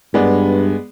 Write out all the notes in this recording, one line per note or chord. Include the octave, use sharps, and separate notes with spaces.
G2 G#3 B3 D5